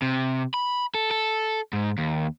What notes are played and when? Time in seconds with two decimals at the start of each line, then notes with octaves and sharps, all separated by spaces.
0.02 C3
0.54 B5
0.95 A4
1.11 A4
1.73 G#2
1.98 D#2